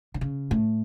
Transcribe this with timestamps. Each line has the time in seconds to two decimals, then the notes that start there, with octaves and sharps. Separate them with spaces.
0.14 D3
0.21 C#3
0.51 A2